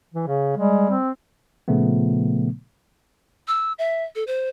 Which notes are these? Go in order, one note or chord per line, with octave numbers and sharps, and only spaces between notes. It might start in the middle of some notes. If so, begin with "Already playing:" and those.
E3
C#3
G3 G#3
C4
A#2 C#3 F3 A3 B3
E6
E5
A4
C5